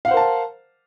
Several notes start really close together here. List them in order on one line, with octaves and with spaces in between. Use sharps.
F5 F#5 C5 A#4 A5